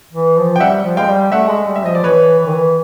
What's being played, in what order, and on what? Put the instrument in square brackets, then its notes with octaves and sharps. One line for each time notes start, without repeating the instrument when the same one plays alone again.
[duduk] E3
F3
[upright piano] G5
[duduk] G3 [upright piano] E5 F#5
[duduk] F3
[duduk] G#3 [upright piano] F5 G5
[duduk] G3
[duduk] A3 [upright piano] E5 F#5
[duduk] G#3
G3
[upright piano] E5
[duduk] F3 [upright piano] D#5
[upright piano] D5
[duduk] E3 [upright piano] B4 C#5
[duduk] E3
D#3
E3